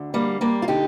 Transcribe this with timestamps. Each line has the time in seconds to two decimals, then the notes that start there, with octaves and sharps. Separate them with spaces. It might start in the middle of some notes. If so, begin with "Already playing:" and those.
Already playing: D2 D3
0.14 G3 A#3
0.41 G3 A#3
0.62 F4
0.68 D3 D#4 G4